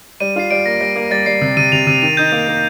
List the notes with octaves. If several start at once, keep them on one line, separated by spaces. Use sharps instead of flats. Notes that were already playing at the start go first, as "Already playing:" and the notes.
G3 D#7
F4 C7
G3 D7
A#3 A#6
G3 A#6
A#3
G3 A6
G3 C7
C3
C3 D#7
C3 F7
C3 D#7
D#3 D#7
D#4 G6
A#3
A#3